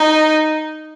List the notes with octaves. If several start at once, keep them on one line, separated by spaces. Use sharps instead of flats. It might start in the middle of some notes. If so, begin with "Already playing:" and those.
Already playing: D#4